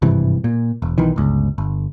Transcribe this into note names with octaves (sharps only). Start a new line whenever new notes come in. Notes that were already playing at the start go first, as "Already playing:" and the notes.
G#1 G2 C3 E3
A#2
E1
B1 D#3 E3
G1 C#2
G1